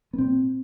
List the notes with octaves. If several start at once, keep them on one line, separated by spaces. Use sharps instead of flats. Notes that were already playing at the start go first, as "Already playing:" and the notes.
B3
A#2 C4